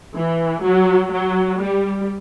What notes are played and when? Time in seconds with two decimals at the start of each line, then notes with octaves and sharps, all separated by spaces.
0.15 E3
0.63 F#3
1.12 F#3
1.60 G3